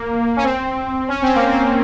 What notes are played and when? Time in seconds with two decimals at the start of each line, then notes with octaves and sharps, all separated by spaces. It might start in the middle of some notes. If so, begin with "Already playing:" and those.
Already playing: A#3
0.36 C#4
0.43 C4
1.08 C#4
1.22 C4
1.35 A#3
1.49 C4